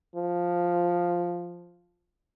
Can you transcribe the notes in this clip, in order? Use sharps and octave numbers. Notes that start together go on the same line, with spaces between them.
F3